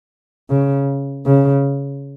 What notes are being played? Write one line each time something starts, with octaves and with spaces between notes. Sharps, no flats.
C#3
C#3